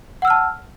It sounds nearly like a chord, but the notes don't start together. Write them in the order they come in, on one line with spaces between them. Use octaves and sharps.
F#5 E6 F6 A5